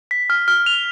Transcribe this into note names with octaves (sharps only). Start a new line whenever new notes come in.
B6
F6
F6
F7